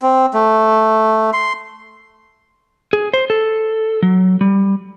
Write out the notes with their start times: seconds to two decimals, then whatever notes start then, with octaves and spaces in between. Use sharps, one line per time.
0.02 C4
0.34 A3
1.33 C6
2.93 G#4
3.14 C5
3.30 A4
4.03 F#3
4.41 G3